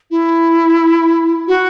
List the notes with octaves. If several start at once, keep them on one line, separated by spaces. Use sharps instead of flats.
E4
F#4